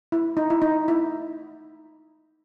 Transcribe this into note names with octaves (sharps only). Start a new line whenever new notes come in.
E4
D#4
E4
D#4
E4